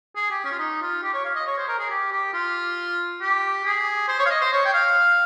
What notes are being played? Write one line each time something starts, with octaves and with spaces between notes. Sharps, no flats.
G#4
G4
C#4
F4
D#4
F4
G4
C#5
F5
D#5
C#5
C5
A#4
G#4
G4
G4
F4
G4
G#4
C5
C#5
F5
D#5
C5
C#5
G5
F5